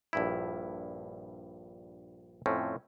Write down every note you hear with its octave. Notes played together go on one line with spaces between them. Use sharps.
A#1 G2 E4
F2 A2 C4 C#4